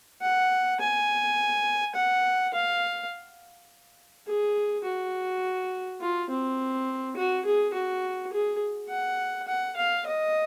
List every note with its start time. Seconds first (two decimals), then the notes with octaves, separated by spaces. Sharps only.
0.22 F#5
0.80 G#5
1.95 F#5
2.53 F5
4.27 G#4
4.84 F#4
6.01 F4
6.29 C4
7.16 F#4
7.45 G#4
7.73 F#4
8.32 G#4
8.89 F#5
9.47 F#5
9.76 F5
10.06 D#5